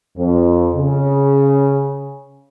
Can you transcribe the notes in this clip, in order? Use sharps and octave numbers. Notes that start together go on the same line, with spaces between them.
F2
C#3